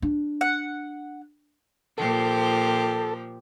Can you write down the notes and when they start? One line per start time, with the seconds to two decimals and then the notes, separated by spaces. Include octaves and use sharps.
0.02 D4
0.41 F#5
1.98 A#2 F3 G4 A4 C5